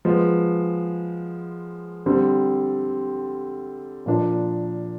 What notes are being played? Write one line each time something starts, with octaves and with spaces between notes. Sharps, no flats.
F3 G#3 B3
D3 G3 C4
A#2 F3 A#3 D4 F4